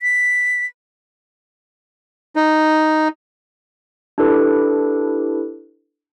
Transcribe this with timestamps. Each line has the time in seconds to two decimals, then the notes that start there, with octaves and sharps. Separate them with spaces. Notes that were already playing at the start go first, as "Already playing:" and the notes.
0.02 B6
2.36 D#4
4.18 D4 E4 G4 A4 B4